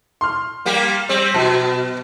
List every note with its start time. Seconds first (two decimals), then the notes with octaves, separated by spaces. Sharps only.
0.21 C6 F6
0.65 G3 A#3 G4
1.09 G3 C4
1.34 B2 F#3 A5